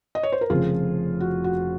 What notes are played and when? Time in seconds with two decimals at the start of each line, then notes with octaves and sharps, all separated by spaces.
0.15 D#5
0.23 C#5
0.32 C5
0.41 A#4
0.50 F1 F2 C#3 F3 F4 G#4
1.20 F#4
1.44 F#4